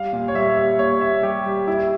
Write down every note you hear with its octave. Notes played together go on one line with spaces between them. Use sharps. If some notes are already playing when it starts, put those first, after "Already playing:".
Already playing: G3 F5
A#2
C#5
G3 E5
G3 E5
A#2 C#5
G3 E5
G3 G4
G3
G3 E4